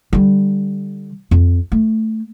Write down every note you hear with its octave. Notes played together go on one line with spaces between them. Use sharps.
D3 G3
F2
A3